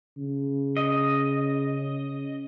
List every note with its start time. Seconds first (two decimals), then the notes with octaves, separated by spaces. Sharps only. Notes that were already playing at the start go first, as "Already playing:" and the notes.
0.17 C#3
0.77 D#5